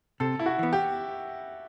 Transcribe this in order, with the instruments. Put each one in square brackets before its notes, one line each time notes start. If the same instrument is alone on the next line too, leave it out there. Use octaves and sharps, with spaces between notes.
[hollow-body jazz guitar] C3 [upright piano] A4
[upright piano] E4
F#4
[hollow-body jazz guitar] E3 B3
[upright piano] G4